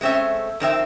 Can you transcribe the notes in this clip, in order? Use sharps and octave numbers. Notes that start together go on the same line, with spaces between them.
G#3 A3 C4 C#4 E5
F2 D#3 C4 E5